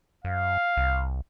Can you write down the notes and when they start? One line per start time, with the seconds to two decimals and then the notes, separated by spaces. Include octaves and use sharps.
0.24 F#2 F5
0.77 C2